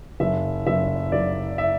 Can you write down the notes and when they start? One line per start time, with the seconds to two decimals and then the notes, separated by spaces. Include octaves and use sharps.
0.20 F#1 E5
0.67 F#1 E5
1.12 F#1 D5
1.58 E5